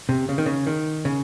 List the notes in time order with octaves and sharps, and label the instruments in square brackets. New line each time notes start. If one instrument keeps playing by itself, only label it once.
[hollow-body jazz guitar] C3
C#3
D#3
C#3
D#3
C#3